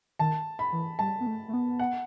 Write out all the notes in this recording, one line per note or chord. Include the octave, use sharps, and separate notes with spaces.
D#3 A5
B5
E3
G3 A5
B3
A3
A3
B3
F#5